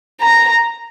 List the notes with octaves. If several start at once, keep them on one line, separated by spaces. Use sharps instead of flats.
A#5